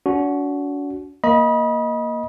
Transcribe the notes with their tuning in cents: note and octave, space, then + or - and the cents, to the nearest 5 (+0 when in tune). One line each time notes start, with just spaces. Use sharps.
D4 -45 F#4 +0
A#3 +0 D#5 +10 B5 -30